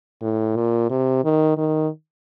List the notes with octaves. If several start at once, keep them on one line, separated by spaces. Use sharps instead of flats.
A2
A#2
C3
D#3
D#3